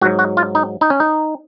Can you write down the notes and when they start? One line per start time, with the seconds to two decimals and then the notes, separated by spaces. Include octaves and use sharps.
0.01 G#2 F#4
0.05 F#3
0.19 F#4
0.37 F4
0.55 D#4
0.81 D#4
0.90 C#4
1.00 D#4